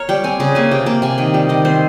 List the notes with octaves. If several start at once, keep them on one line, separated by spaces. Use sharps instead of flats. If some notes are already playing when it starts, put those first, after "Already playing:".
Already playing: A#4 C#5
G3 G5
C4 G#5
C#3
A#3 G#5
C3 G5
A#3 G5
C3 G#5
D#3 G5
G3 G5
D#3 D#5
C4 C5